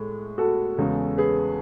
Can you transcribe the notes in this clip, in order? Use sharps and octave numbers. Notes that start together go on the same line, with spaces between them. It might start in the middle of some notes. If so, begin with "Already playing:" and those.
Already playing: A2 G#3
F#4 A4
E2 C#3 G#3
G#4 B4